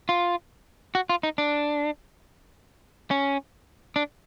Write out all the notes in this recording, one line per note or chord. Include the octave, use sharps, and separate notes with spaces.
F4
F#4
F4
D#4
D4
C#4
D4